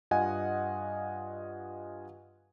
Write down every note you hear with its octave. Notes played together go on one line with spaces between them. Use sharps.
G2 F4 D#5 F#5 G#5